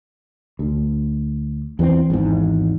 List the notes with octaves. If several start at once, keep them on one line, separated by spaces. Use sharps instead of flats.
D2
E2 E3 A#3 C4
G#1 E2 G#2